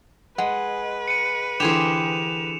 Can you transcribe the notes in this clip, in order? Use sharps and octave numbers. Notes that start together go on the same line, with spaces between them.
G#3 B4 F#5
C#7 D#7
D3 E3 G4 G#4 C5 E7 F7